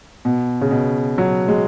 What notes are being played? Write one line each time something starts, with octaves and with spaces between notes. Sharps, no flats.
B2
C#3
B2
F#3
G#3